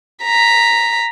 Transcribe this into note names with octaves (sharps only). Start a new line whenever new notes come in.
A#5 B6